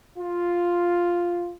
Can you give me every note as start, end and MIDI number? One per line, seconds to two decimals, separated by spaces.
0.18 1.53 65